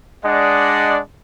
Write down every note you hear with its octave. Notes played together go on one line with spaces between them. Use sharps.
G#3 D4 D5 D#5 F#5